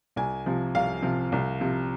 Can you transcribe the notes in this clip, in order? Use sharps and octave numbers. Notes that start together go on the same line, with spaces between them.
C2 G#5
C3 F3
C2 F5
C3 F3
C2
C3 F3